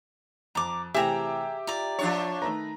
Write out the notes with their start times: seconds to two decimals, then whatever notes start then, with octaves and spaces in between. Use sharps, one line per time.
0.55 F2 A#5 D6
0.94 C3 E3 A3 G4 G#4 E5 G5 A#5
1.67 F4 D5 A#5
1.99 F3 D4 C#5
2.42 D#3 A3 B4 A#5